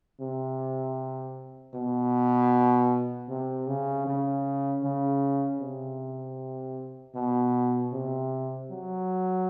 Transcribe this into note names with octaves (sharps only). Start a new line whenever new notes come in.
C3
B2
C3
C#3
C#3
C#3
C3
B2
C3
F#3